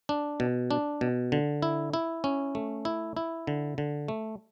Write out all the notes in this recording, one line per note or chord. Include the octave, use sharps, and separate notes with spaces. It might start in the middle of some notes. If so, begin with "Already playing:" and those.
D4
B2
D4
B2
D3
E4
E4
C#4
A3
E4
E4
D3
D3
A3